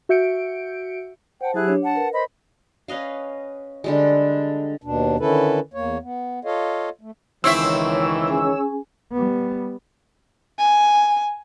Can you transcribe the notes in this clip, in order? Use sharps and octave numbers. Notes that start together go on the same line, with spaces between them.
F#4 E5 G6 C#7 D7
C5 F#5 G5 A5
F#3 E4 G4 G#4 F#6
D4 C#5
F#5 A5
A#4 B4
C5 D#5 B5
C#4 B4 D#5 F5
D3 G3 G#3
D#2 B2 D4
D3 D#3 C#4 E4 A4 B4
E2 A#3 C#5
B3
F4 A4 C#5 D#5 F5
A3
C#2 D#3 E3 C4 E4 C#5 E5 E6
C#4 G#4 G#5
G3 B3
G#5